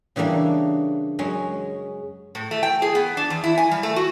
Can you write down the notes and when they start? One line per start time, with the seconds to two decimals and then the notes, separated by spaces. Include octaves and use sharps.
0.16 C#3 E3 G3 A#3 D4
1.19 F#2 G#3 C#4
2.35 A2
2.51 A3
2.63 G5
2.82 G#4
2.95 B3
3.17 D4
3.30 E2
3.44 E4
3.58 G#5
3.71 G3
3.83 A3
3.96 F#4